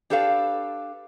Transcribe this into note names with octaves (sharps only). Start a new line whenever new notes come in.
D4 G4 A4 B4 C5 F5